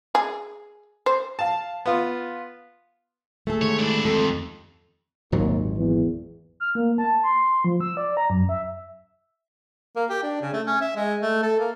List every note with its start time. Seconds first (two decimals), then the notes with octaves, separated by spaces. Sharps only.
0.15 G#4
1.06 C5
1.39 F5 A5
1.86 B3 F4
3.47 A3 G#4 A4
3.62 D#3 G#3 G4 C#5
3.79 D4 E4
4.05 F2 A4
5.32 G#1 D#2 A#2 F#3
5.77 E2
6.60 F6
6.75 A#3
6.98 A5
7.23 C6
7.65 F3
7.81 E6
7.97 D5
8.17 A#5
8.30 F#2
8.49 E5
9.96 A#3
10.10 G4
10.23 D4
10.42 C#3
10.54 A3
10.67 C#4
10.81 E5
10.96 G#3
11.22 A3
11.43 A4
11.59 A#3